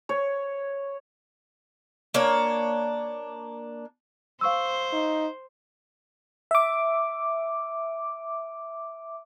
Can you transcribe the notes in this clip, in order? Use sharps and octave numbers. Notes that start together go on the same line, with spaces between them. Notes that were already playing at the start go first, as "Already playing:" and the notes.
C#5
A#3 D4 C#5
C5 F5 C#6 E6
D#4
E5 D6